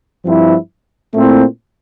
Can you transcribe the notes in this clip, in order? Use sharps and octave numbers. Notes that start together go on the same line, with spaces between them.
G2 F3 C4 E4
A#2 A3 C4 E4